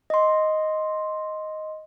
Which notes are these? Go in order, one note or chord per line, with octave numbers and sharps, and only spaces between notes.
D#5 C6